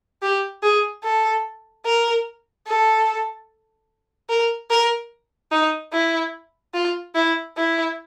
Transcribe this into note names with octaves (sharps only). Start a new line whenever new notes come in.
G4
G#4
A4
A#4
A4
A#4
A#4
D#4
E4
F4
E4
E4